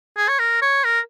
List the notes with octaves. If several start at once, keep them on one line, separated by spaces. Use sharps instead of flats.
G#4
C#5
A#4
C#5
A#4